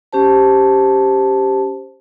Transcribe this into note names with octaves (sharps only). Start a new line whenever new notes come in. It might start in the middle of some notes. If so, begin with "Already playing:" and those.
C#4 G4 C5 A5